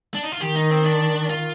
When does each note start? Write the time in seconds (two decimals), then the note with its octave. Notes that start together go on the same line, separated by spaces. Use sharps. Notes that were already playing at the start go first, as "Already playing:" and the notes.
0.14 D4
0.23 D#4
0.32 F4
0.41 D#3 G4
0.56 D#4
0.70 C4
0.85 D4
1.30 F4